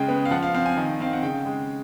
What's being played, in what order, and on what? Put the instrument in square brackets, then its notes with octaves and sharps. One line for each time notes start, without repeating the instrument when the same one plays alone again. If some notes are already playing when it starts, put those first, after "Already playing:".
Already playing: [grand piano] C#3 G#3 G5
B3
F5
F3 F#5
F5
C4 F5
G#5
D#3
C4 F5
F#5
C#3 G5
G#3